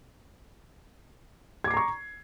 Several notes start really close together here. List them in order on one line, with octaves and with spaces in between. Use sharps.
G#6 D6 C7 A#5 C#6